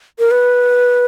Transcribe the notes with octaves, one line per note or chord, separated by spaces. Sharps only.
A#4
B4